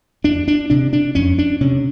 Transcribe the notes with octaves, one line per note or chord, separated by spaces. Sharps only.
F2 D4
D4
C3 D4
D4
F2 C#4
D4
C3 C#4